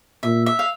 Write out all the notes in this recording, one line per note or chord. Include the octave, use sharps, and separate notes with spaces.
A#2 E5
E5
F5